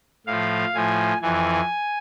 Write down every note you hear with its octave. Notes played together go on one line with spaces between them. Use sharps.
A2 F3 F5
A2 F3 G#5
F2 E3 G#5